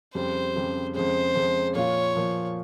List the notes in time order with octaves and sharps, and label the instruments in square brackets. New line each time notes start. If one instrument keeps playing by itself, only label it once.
[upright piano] F2 C#3 G3 [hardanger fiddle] C5
[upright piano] F2 C#3 G3
[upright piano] F2 C#3 G#3 [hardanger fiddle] C5
[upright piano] F2 C#3 G#3
[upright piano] A#2 F3 A#3 F4 [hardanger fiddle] C#5
[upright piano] A#2 F3 A#3 F4